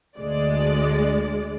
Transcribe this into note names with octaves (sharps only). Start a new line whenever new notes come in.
D2 G#3 D5